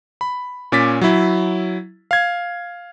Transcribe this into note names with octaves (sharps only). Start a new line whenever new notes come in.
B5
A#2 C#4 D6 A6 B6
F#3 E4
F5 G#6